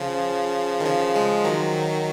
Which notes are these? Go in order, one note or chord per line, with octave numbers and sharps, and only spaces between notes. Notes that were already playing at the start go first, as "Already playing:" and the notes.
Already playing: C#3 F3
D#3
C#3 F3
F3 G#3
D#3 F#3